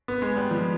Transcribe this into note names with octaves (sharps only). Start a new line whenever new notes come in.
B3
G#3
G3
F3